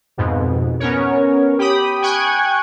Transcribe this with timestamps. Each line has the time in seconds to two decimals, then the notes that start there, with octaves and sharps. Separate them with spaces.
0.18 F2 G#2 B2
0.80 B3 C#4 A#4 C#5
1.58 G4 G5 B5 D#6
2.02 G5 G#5 C#6 F#6 G#6